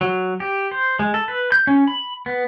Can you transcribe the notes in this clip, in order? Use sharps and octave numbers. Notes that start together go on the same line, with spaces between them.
F#3
G4
C5
G#3
A4
B4
G6
C#4
B5
B3